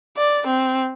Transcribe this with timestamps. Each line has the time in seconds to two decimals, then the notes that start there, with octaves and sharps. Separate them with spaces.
0.17 D5
0.47 C4